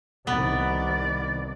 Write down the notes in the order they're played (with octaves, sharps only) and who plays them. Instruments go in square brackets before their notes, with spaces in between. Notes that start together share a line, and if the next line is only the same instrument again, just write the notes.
[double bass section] C2 D#3 [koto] B3 [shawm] D5